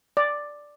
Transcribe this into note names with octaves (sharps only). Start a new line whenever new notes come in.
D5